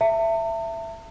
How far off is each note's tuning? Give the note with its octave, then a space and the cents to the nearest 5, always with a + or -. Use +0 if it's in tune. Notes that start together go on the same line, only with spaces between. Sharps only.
E5 +15 A5 +45